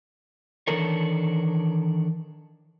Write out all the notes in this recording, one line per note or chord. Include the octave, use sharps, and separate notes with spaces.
D#3 E3 D4 A4 A#4 C#5